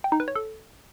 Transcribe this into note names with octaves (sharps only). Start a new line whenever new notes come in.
G5
D#4
B4
C#5
A4